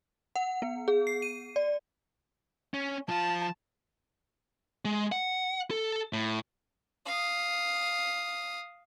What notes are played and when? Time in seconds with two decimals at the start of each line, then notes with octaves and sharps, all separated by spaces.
0.36 F#5
0.62 B3
0.88 G#4
1.07 C7
1.22 D#7
1.56 D5
2.74 C#4
3.09 F3 F4 A5
4.85 G#3
5.12 F#5
5.71 A4
6.13 A2
7.06 F5 D#6